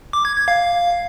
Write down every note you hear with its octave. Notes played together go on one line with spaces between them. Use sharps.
D6
G#6
G#6
F5